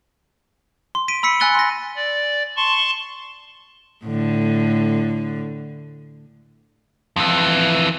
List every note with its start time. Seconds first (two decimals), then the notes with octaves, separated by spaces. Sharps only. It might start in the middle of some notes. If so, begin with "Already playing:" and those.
0.95 C6
1.08 B6 D7 D#7
1.23 B5 E6 B6 C#7
1.40 G#5 E6 F#6 A6 D#7 G7
1.55 C6 A#6
1.96 D5
2.57 A5 C6 C#6
4.05 A2 D3
7.16 F2 E3